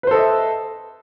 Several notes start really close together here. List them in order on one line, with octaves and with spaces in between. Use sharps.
B4 C5 A4 D#5 E5